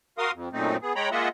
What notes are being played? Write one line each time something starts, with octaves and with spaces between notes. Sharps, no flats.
F#4 A#4 F5 C6 D#6
F2
F#2 A#2 A3 C4 D#4
B3 G#4
G#3 C#5 G5 A#5 B5
G#3 A#3 F4 D#5 E5 F#5